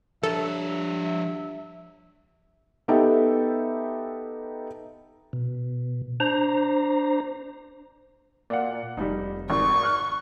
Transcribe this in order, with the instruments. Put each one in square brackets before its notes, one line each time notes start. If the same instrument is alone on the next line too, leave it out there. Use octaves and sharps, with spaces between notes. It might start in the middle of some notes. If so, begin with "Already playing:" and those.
[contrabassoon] G2 [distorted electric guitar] F3 C#5 [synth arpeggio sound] A4 [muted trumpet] E5
[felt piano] B3 D#4 G4 A4 E5 G5
[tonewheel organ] B2
D4 C5 A#5
[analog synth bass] A#2 [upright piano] D5 F5 F#5
[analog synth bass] F1 [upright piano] G3 D#4
[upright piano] G#1 D#4 [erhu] C#6
[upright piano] F6 F#6